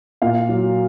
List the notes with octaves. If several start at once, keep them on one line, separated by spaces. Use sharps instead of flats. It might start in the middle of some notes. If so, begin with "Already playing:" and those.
A#2 F5
F#3